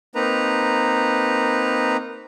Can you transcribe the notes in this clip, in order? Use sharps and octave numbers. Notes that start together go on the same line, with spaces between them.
A#3 C4 D#4 B4 A#5